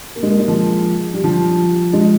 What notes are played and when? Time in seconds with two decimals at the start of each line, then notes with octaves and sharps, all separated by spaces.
0.16 A#3
0.23 G#3
0.31 A#3
0.39 G#3
0.48 F3
1.14 G3
1.24 F3
1.93 G#3